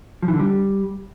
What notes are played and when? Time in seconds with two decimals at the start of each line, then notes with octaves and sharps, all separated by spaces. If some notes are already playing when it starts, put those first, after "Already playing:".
0.22 F3
0.28 E3
0.34 D3
0.39 G3